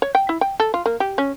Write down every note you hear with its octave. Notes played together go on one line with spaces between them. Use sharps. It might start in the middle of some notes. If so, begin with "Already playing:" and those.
C#5
G5
E4
G5
A4
F4
A#3
G4
C#4